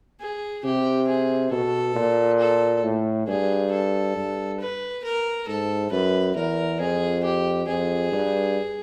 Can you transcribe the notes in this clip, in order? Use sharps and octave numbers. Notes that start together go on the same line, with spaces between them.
G#4
C3 G4
G#4
B2 A4
A#2
A4
A2
G2 G#4
A4
G2
B4
A#4
G#2 A4
F#2 B4
E2 A#4
F2 G#4
G4
F2 G#4
G2